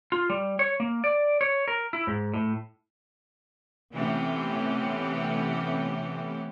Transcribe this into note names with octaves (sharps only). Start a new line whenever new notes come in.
F4
G3
C#5
A#3
D5
C#5
A#4
E4
G#2
A2
C3 E3 A3 B3 C#4 G4